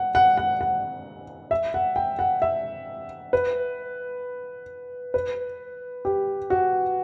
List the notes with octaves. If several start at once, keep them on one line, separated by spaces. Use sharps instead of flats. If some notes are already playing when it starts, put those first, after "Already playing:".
Already playing: F#5
F#5
F#5
F#5
E5
F#5
G5
F#5
E5
B4
B4
G4
F#4